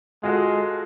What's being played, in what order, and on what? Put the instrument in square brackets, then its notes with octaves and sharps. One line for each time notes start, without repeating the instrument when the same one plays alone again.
[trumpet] G#3 [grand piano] F4 F#4 A4